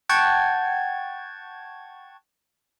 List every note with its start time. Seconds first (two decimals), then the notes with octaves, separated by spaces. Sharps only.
0.09 F#5 G5 A5 C#6 G#6